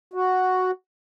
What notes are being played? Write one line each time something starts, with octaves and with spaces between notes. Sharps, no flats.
F#4